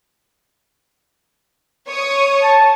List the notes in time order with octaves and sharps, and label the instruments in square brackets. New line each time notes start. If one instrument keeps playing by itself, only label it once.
[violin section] C#5 C#6 D#6
[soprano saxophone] A5